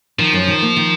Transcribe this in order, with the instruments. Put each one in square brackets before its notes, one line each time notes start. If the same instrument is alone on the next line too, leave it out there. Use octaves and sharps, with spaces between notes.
[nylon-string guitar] D#3 [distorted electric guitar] F3
[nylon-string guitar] F#2
D#3
A#3
D#3